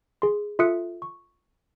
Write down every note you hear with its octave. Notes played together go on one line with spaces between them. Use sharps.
G#4 C6
F4 A4 E5 D#6 F#6 C#7
C#6